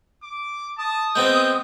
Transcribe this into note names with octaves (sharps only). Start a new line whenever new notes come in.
D6
A5 D#6
G#3 B3 C4 G6